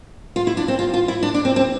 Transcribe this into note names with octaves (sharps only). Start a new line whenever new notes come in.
F4
E4
D4
C4
F4
F4
E4
D4
D4
C4
C4